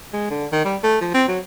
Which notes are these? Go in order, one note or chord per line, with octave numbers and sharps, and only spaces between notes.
G#3
D3
D#3
G3
A3
F3
C4
F#3